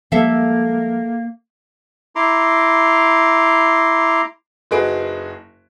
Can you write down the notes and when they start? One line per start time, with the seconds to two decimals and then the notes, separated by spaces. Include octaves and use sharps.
0.12 F3 G3 G#3 A#3 A4 E5 F5
2.16 E4 A#5 C6 D6
4.71 F#1 D#4 F#4 G#4 B4 D7